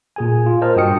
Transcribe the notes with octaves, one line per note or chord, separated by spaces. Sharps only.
A#2 G#4 G#5
F4
A#4 C5 D#5 A5 F6
G2 F#4 G5 D#6 C#7